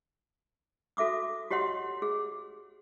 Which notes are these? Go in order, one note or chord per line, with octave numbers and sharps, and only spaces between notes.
F#4 A4 E5 D6 D#6
F#4 G4 C#5 D#5 F#5 C6
G#4